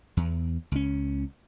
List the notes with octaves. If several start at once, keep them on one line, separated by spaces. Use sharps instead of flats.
E2
C#2 C#4